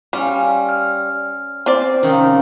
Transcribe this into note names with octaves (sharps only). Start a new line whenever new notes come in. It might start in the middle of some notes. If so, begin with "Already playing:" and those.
G3 C#4 F4
F6
C4 D5
C3 D#3 F3 C#4 G4